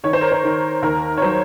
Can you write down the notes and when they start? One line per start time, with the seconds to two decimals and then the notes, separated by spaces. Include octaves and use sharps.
0.04 D#3 C#5
0.13 C5
0.21 A#4
0.31 C5
0.44 D#3
0.82 D#2 A#4
1.17 C#5
1.22 F#3 C5